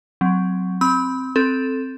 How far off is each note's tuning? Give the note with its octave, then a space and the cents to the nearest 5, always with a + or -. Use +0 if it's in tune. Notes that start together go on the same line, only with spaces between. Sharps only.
F#3 +0 C4 -10
C4 +0 B5 +0 E6 -35
C4 +0 A4 +0